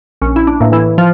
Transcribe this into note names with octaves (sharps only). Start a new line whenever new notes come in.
A#1 C#4
E4
D4
A2 E3 A#3
E3 E4
F3 F4